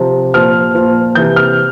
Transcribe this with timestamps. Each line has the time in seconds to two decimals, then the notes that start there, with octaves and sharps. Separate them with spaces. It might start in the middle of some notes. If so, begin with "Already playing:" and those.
Already playing: C3 F3
0.34 A#2 F3 F6
0.75 A#2 F3
1.15 C3 E3 G6
1.36 F6